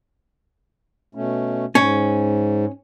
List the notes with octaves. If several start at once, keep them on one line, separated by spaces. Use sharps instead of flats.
B2 A3 C#4
G#2 C#4